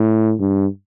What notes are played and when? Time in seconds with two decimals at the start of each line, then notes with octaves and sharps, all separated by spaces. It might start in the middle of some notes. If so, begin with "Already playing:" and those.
Already playing: A2
0.40 G2